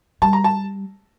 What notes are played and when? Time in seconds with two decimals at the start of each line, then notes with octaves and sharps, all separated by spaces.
0.22 G3 A5
0.33 A#5
0.44 A5